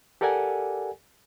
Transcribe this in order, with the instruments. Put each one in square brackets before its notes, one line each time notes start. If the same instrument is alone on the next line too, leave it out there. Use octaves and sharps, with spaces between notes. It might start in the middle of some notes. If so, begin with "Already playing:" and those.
[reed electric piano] G4 A4 A#4 D5 F#5 G#5